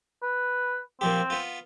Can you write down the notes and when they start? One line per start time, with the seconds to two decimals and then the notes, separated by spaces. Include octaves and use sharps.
0.23 B4
1.01 A#2 F3 C4 G4
1.30 B3 F4